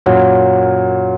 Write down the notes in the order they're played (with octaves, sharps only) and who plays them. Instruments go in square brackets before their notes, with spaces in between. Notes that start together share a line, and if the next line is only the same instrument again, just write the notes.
[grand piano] F#2 A#2 [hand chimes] F#4 C#5 F#5